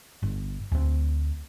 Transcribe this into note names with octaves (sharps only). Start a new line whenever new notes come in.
G1
D2 C4